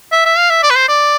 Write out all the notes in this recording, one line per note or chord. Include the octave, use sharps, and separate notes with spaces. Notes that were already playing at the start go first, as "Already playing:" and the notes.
E5
E5
F5
E5
D5
B4
C5
D5